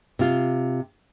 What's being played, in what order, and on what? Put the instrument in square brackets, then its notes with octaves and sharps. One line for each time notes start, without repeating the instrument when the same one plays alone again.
[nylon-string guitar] C3 F4